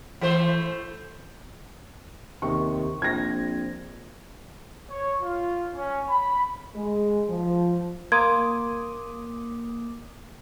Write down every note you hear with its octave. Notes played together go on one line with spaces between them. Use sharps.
E3 A3 C5
D#2 C3 D#3 C#6
A#1 C4 G#6 A#6
C#5
F4
C#4
B5
G#3
F3
A#3 C6 D6 D#6 G#6